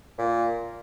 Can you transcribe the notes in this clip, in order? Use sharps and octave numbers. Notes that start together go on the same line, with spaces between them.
A#2